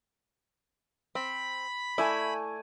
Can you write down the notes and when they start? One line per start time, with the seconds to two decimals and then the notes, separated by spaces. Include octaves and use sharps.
1.15 C4 B5
1.98 A3 E4 D5 G#5